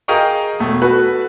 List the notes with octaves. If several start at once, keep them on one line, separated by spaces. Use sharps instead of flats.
G#4 A#4 D#5 F5 G5 C#6
E1 A3
F#4 A4 B4